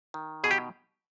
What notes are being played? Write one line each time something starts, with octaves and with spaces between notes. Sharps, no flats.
D#3
B2 G#4
G4